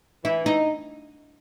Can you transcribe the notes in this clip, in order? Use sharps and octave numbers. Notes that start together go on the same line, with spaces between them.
E3 E4
D#4